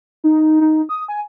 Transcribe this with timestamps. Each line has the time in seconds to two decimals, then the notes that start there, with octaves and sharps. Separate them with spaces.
0.24 D#4
0.61 D#4
0.89 D#6
1.08 G#5